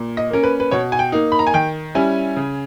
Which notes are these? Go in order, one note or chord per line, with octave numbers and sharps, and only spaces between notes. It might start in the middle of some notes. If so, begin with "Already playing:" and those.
Already playing: A#2
D#5
A#3 C#4 A#4
B4
B4
B2 C#5
G#5
G5
A#3 D#4
B5
A#5
G#5
D#3 G5
G3 C#4 E4 G#5
C#3